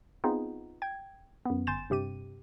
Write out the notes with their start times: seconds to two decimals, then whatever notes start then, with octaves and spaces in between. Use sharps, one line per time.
0.24 B3 C4 D#4 F4 G#4
0.82 G5 G#6
1.46 F#2 B3
1.67 G1 G#5 C6 G6 A6 E7
1.90 G2 C3 G4 D#7